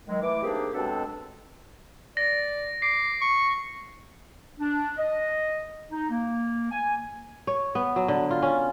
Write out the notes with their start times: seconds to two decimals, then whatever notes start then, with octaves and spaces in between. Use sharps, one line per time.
0.08 D#3 F#3 G#3
0.22 E3 A3 D6
0.42 A#3 C4 D4 D#4 G4 G#4
0.74 B2 F#3 G#3 C4 D4 A4
2.17 D5 A#6
2.82 D6 C7
3.21 C#6
4.60 D4
4.97 D#5
5.91 D#4
6.09 A#3
6.71 G#5
7.47 C#5
7.75 B3
7.96 F#3
8.08 D3
8.31 F4
8.42 C#4